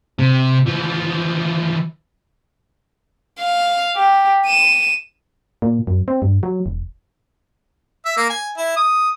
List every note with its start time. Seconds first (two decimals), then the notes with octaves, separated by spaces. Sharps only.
0.19 C3
0.67 E3 F3
3.39 F5
3.96 G4
4.47 D#7 E7
5.62 A#2
5.87 F#2
6.08 C4
6.22 G2
6.43 F#3
6.66 E1
8.05 E5
8.17 A#3
8.30 G#5
8.57 E4
8.76 D#6